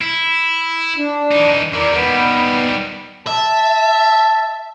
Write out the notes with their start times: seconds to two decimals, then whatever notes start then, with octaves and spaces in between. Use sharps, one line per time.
0.01 E4
0.98 D4
1.31 E3 D#4
1.73 E2 E3 A#4 D5
1.93 D#3 G3 B3
3.27 E5 A5